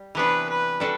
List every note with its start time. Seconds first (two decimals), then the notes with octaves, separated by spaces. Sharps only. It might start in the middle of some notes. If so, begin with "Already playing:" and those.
Already playing: G3
0.15 C3 E3 B3 D4 B4
0.49 B4
0.80 G3 D4 F#4 A4